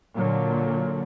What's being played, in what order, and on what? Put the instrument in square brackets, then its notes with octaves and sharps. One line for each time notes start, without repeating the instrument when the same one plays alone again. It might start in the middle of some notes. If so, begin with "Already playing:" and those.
[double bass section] A#2 D3 F#3